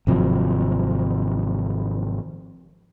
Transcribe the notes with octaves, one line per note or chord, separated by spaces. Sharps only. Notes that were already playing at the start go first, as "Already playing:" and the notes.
G#1 C3 F3 F#3